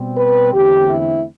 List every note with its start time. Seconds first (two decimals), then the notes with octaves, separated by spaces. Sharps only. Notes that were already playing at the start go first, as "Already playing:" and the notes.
Already playing: B2 G3 C4
0.18 B4
0.54 E2 D3 A3 C4 G4
0.90 E4